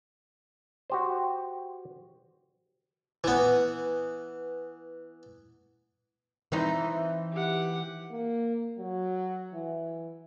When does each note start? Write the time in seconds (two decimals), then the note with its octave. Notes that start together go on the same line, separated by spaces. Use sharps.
0.90 F#4 G4 C5
3.24 E3 B3
6.52 E3 C4 D#4
7.32 G4 F#5
8.10 A#3
8.78 F#3
9.54 E3